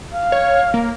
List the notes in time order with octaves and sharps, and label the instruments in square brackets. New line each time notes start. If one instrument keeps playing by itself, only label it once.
[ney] F5
[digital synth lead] C#5
A#3